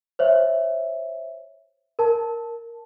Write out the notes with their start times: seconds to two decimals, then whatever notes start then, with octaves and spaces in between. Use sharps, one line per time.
0.19 C5 C#5 E5
1.99 A#4 A5